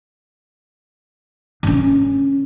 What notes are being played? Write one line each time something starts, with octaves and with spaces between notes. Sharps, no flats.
D3 C#4